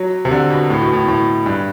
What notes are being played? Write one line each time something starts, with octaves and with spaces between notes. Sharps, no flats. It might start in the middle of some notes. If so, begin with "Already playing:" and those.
Already playing: F#3
C3
D3
B2
A2
B2
A2
A2
G2